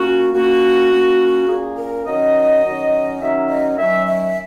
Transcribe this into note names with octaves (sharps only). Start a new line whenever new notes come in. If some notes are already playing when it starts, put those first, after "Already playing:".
Already playing: A#2 A#3 C#4 F#4
A#2 A#3 C#4 F#4
A#2 A#3 C#4
A#2 A#3 C#4 G#4
A#4
D#3 F#3 C#4 D#5
D#3 F#3 C#4
D#3 F#3 C#4 E5
D#5
D#3 F#3 C#4 E5
E5